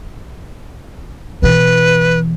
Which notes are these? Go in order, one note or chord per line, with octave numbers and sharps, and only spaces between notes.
B2 E3 B4